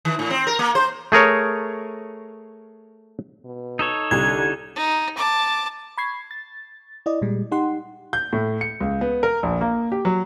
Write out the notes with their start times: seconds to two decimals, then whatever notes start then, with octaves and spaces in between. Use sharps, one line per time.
0.05 D#3
0.19 A2
0.30 C4
0.47 A#4
0.59 A#3
0.75 C5
1.12 A3 G#4 A#4 C#5
3.45 B2
3.79 D#4 A4 C#5
4.11 C2 D3 G#6
4.76 D#4
5.17 A5 D6
5.98 B5 C#6 G#6 C7
6.31 A6
7.06 E4 D5 D#5
7.22 A#2 G3 G#3
7.52 D#4 G4 F#5 C6
8.13 G6
8.33 A2
8.61 C#7
8.80 C#2
9.01 B3
9.23 A#4
9.43 A#1
9.61 A#3
9.92 G4
10.05 F#3